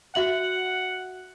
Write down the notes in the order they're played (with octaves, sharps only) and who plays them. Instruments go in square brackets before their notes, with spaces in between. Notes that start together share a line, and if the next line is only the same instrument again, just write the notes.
[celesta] F#4 E5 F#7 [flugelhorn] F#5